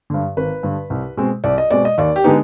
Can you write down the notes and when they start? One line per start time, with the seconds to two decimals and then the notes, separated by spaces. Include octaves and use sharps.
0.10 G2 D3
0.37 G#1 B4
0.63 G2 D3
0.90 C2
1.17 B2 G#3 C4
1.44 C2 D5
1.58 D#5
1.71 B2 G#3 C4 D5
1.85 D#5
1.98 D#2 D5
2.16 G4
2.24 D3 G#3 B3 D#4